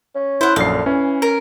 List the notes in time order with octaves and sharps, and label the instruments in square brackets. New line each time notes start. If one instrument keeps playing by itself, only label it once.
[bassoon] C#4
[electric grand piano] E4 [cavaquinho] C5 F#5
[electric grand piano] A#1 F#2 C7 [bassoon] D3 [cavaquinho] F5
[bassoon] E3 [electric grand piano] C#4
[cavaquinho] A#4